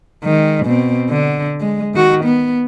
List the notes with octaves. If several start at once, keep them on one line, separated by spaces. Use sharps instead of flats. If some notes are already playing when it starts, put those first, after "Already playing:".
D#3 G#3
B2 C4
D3
G#3
D#3 F#4
B3